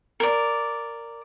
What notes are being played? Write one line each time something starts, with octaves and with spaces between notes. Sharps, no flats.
A#4 D5